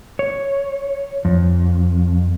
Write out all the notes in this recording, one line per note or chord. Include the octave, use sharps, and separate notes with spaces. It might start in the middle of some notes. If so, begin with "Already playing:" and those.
C#5
F2